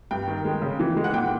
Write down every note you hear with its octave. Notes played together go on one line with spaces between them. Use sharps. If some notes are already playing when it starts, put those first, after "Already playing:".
G2 G5
D#3
G#3
C#3
E3
G#3
F#5
A#2 G5